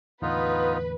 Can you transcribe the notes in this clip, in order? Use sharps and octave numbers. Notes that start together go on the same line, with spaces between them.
E2 A2 D3 B3 D#4 F4 B4